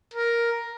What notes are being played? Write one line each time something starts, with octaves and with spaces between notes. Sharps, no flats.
A#4